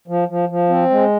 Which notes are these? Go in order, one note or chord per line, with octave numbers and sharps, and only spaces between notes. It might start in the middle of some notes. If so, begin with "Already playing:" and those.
F3
F3
F3
C4
G#3